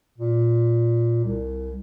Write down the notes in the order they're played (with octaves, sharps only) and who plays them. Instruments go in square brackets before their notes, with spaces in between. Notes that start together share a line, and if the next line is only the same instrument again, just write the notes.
[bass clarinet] A#2
C2